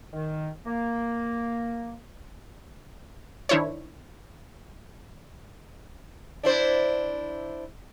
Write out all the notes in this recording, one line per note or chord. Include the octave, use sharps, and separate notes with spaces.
D#3
A#3
D#3 D4 E4 C5 C#5
D4 E4 C5